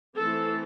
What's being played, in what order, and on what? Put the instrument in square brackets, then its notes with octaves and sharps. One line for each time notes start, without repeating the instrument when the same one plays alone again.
[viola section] E3 A3 C4 A4